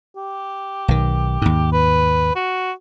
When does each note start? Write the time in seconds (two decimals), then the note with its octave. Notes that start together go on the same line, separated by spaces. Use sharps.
0.17 G4
0.88 B1 D#3
1.42 D#2 G#2
1.72 B4
2.36 F#4